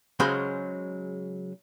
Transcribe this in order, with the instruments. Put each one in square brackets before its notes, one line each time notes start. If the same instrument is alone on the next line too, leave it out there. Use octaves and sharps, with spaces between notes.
[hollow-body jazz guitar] C#3 F#3 G#3 C#4 C5 B5